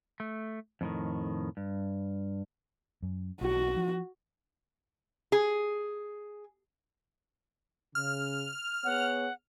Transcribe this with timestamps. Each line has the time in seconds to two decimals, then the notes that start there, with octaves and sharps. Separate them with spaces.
0.20 A3
0.81 F2 A2 D#3
1.57 G2
3.02 F#2
3.41 B1 F#4
3.76 F3
5.32 G#4
7.95 C#3 F6
8.84 B3 G#4 C#5 F#5